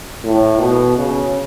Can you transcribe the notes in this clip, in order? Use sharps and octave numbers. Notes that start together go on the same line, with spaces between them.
A2
B2
C#3